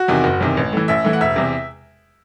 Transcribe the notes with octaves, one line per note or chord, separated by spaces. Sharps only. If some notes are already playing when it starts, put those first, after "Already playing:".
Already playing: F#4
E2 C3 D#3
F#1
E2 C3 D#3
A1
A2 E3
A1 E5
A2 E3
F#5
E1 E5
E2 C3